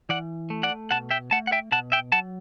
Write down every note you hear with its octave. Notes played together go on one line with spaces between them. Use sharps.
E3 D5 F#5
A3
D5 F#5
B2 F#5 A5
E5 G5
A3 F#5 A5
F#5
E5 G5
B2 F#5 A5
E5 G5
F#3 F#5 A5